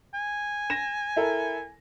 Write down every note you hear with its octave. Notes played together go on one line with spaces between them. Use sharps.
G#5
A#6 E7
E4 A4 A#4